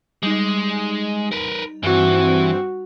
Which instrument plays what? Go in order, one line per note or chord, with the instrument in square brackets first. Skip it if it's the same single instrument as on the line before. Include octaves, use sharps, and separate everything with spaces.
[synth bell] G3 D#4 [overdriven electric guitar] G#3
[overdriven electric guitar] A#4 B4
[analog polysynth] G2 C4 [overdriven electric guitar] E3 [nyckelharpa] F#4